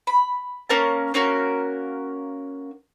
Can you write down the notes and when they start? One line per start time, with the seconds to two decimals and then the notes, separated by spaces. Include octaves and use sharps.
0.07 B5
0.69 A#3 C#4 A#4 A5
1.14 A#3 C#4 F#4 A#4